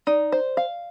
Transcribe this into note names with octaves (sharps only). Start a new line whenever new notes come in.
D#4 D5
C5
F5